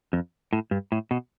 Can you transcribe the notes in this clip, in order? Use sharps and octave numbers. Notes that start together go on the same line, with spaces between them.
F2
A2
G2
A2
B2